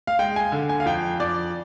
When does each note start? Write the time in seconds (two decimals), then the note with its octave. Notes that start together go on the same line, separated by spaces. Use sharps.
0.07 F5
0.19 G#3 G5
0.36 G#5
0.52 D3
0.69 G#5
0.80 F5
0.86 F2 G5
1.20 F2 D5